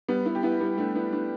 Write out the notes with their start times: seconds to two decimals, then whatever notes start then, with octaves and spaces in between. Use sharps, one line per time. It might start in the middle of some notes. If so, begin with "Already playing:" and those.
0.08 G3 B3
0.26 B3 E4
0.35 G4
0.43 B3 E4
0.60 G3 B3
0.78 A3 D4
0.95 B3 E4
1.12 A3 D4